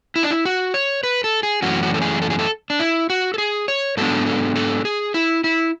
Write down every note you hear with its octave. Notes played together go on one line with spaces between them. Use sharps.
E4
D4
E4
F#4
C#5
B4
A4
G#4
F#2 E3 A3 C#4 F#4
F#4
A4
G#4
A4
G#4
A4
D4
E4
F#4
A4
G#4
C#5
G#2 F#3 B3 D4 A4
A4
A4
G#4
E4
E4